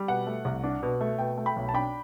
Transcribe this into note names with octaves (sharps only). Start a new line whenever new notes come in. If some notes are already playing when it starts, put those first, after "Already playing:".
Already playing: G3
B2 F#5
A3
C2
D4
B2
A3
B2 G5
A3
G5 B5
B1
A5
D4 G5 B5